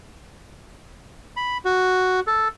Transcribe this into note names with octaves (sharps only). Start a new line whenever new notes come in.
B5
F#4
A4